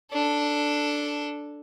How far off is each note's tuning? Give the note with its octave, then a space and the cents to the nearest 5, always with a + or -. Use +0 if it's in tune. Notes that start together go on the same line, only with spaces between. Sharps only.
D4 +0 A4 +0